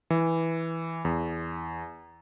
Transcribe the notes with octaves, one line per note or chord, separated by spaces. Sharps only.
E3
E2